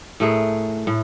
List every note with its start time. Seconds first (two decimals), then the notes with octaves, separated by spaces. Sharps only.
0.20 A2 A3 G#4 A#4
0.87 A2